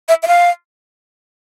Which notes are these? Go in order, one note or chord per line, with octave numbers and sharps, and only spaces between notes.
E5
E5
F5